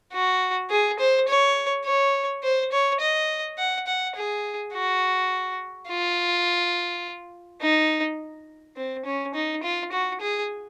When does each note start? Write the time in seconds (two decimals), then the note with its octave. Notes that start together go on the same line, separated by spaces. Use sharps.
0.13 F#4
0.70 G#4
0.99 C5
1.28 C#5
1.85 C#5
2.43 C5
2.72 C#5
3.01 D#5
3.58 F#5
3.87 F#5
4.16 G#4
4.73 F#4
5.89 F4
7.61 D#4
8.76 C4
9.05 C#4
9.34 D#4
9.63 F4
9.92 F#4
10.21 G#4